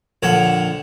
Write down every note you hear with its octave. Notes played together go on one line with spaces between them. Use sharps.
A#1 D3 C#5